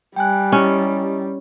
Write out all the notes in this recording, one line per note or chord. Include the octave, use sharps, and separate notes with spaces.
G3 G5 G#5 F#6
C#4 E4 G4 D#5